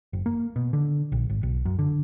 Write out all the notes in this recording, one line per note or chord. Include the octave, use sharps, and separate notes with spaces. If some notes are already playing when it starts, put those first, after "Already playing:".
F#1
A#3
B2
D3
A#1
G#1
B1
F#2
D3